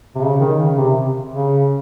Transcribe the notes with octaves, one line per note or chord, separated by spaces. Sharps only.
C3
C#3
D#3
C#3
C3
C#3